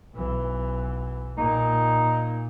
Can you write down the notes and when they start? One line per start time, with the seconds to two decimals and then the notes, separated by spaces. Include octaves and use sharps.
0.15 B1 E3
1.38 A#2 A#3 D#4